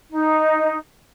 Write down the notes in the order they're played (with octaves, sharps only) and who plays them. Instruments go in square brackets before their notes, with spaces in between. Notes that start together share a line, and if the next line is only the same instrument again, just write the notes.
[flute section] D#4